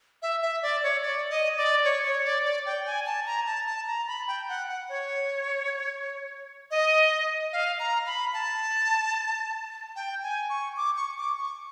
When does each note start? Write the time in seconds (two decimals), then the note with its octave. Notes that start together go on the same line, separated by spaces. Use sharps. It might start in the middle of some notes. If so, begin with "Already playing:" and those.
0.22 E5
0.42 E5
0.62 D5
0.83 C#5
1.03 D5
1.30 D#5
1.57 D5
1.84 C#5
2.05 C#5
2.24 D5
2.45 D5
2.66 G5
2.86 G#5
3.06 A5
3.26 A#5
3.47 A5
3.67 A5
3.87 A#5
4.08 B5
4.28 G5
4.49 F#5
4.68 F#5
4.89 C#5
6.71 D#5
7.53 F5
7.80 A#5
8.06 B5
8.34 A5
9.96 G5
10.23 G#5
10.50 C#6
10.77 D6
10.97 C#6
11.18 D6
11.38 C#6